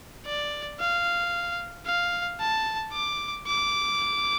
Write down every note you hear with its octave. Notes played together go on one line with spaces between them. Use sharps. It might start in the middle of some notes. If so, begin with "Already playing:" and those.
D5
F5
F5
A5
D6
D6